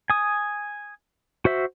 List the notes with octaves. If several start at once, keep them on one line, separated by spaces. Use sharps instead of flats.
G#5 D#6
F#4 C5 E5